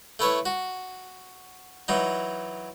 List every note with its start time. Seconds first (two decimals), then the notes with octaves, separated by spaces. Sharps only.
0.19 A3 E4 B4 C#5
0.46 F#4
1.88 E3 F#3 D#4